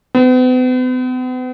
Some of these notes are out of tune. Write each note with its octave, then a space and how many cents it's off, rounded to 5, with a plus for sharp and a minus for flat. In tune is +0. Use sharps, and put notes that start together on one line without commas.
B3 +45